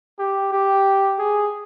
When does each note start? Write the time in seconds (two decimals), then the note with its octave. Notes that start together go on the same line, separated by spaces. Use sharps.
0.19 G4
0.52 G4
1.19 G#4